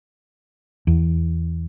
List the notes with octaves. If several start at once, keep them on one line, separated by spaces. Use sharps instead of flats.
E2